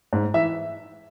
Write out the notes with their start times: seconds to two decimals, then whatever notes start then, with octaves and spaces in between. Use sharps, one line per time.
0.13 G#2
0.34 E3 E5